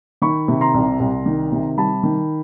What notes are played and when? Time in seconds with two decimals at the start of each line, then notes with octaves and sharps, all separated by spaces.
0.22 D#3 B5 C#6
0.48 C3
0.61 A#5 C6
0.74 C2
1.00 C2
1.26 D#3
1.52 C3
1.77 G3 A5 B5
2.03 D#3